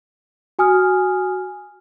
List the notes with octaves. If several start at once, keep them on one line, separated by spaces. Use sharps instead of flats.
F#4 G#5 D#6 F6